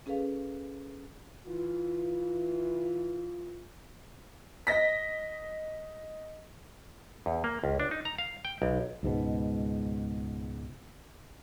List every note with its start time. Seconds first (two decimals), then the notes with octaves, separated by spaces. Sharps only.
0.06 C#4 G#4 A4 B4 F5
1.46 E3 F4
4.67 D#5 A#6 B6
7.26 E2
7.44 A#3
7.64 C#2
7.80 D4
7.91 D#4
8.05 A#5
8.18 F5
8.45 G5
8.62 B1
9.03 C#2 G#2 B2